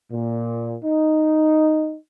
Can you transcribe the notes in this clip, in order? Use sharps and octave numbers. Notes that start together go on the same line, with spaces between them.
A#2
D#4